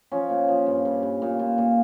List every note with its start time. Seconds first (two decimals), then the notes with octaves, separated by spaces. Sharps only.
0.12 F3 C#4
0.30 A#2
0.48 F3
0.66 G2
0.85 G2
1.03 G2
1.22 A#2
1.39 A#2
1.58 A#2